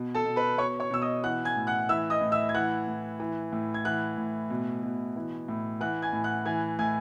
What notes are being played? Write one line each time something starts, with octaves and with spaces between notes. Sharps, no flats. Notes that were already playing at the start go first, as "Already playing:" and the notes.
Already playing: B2
A4 A5
B2
B4 B5
B2 C#5 C#6
C#5 C#6
B2 E6
D#5 D#6
E3 F#5 F#6
G#5 G#6
A2
F#5 F#6
E3 E5 E6
D#5 D#6
A2
E5 E6
G#6
E3 F#5 F#6
A2
E3
A2
G#6
E3 F#5 F#6
A2
B2
B2
E3
A2
E3 F#5 F#6
G#5 G#6
A2
F#5 F#6
E3 G#5 G#6
A2 G#5 G#6